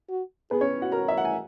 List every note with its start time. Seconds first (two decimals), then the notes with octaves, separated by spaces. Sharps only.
0.09 F#4
0.51 B3 G#4 B4
0.61 C#4 C#5
0.82 F#4 F#5
0.92 F#4 A#4 A#5
1.08 E5
1.18 F#5
1.25 G#5